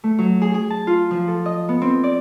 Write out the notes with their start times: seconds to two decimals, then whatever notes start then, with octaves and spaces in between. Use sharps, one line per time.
0.04 A3
0.19 F#3
0.42 G#4
0.54 G#4
0.70 A5
0.87 F4
1.11 F3
1.28 A4
1.46 D#5
1.69 B3
1.82 C4
2.04 D5